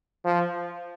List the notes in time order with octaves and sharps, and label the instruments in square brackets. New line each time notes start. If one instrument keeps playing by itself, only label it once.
[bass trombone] F3